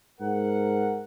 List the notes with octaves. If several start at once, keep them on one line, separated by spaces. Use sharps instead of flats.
G#2 A#4 F#5